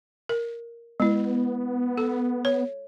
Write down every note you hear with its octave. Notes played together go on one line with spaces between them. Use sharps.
A#4
G#3 B3 E4
A4
C#5